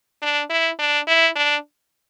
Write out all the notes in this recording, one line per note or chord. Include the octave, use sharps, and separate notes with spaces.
D4
E4
D4
E4
D4